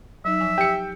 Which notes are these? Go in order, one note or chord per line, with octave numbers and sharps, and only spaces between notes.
F#3 D#4 E5
F3 G#5
G4 G5 C#7